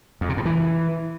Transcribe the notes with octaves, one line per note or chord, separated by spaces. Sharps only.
F2
C3
A2
E3